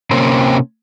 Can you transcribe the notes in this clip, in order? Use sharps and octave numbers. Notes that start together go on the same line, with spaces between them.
C3 A#3 C4 C#4